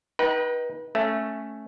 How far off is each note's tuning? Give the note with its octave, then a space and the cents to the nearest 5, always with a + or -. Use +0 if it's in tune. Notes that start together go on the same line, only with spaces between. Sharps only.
D#4 +15 B4 -25 G5 -30
A3 +0 C#4 +0